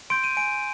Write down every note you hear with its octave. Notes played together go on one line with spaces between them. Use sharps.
C6 G6 D7
D#7
G#5 D7